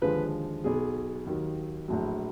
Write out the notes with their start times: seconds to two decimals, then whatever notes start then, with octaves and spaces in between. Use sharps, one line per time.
0.02 D#2 D3 F3 G#3 B4
0.64 B1 B2 F#3 G#4
1.27 D#2 D#3 F#3
1.88 A#1 A2 F#3